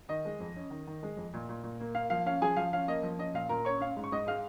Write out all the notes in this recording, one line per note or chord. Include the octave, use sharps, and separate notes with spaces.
D#3 D#5
G#3
F2
C#4
D#3
D#3
G#3
F2
A#2
A#2
A#2
A#3
A#3 F5
F3 F5
C#4 F5
F3 G#4 G#5
F3 F5
C#4 F5
A#3 D#5
F3
C#4 D#5
A#2 F5
A#2 A#4 A#5
C#4 C#5 C#6
C#4 F5
G#2
C#6
G#2 D#5 D#6
G#3 F5 F6